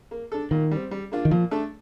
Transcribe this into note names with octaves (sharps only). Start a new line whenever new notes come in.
A#3
D4 A4
A#2 D#3
G3 C4
G3
A#3 D4 F4
D#3
A#2 F3
A3 D4 A4